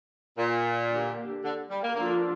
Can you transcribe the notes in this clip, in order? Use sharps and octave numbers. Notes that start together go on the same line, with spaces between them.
A#2
D3 A#3 D4 G4
D3
G3
A#3
D3 F3 A#3 D4 F4